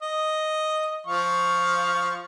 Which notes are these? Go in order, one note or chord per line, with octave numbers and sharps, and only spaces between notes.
D#5
F3 F5 C#6